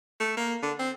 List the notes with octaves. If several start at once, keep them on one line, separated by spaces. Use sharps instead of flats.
A3
A#3
D3
C4